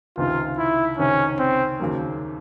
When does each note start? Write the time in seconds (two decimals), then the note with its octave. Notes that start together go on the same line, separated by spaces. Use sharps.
0.17 C#2 C3 D#3 F4
0.58 E4
0.99 C#2 C3 D#3 C#4
1.39 C4
1.80 D#2 C#3 F#3 A#3